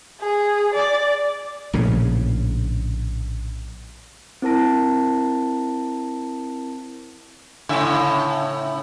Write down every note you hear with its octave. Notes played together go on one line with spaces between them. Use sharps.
G#4
D5
A#1 A2 C#3
C4 E4 A#4 A5 A#6 D7
A2 C#3 E5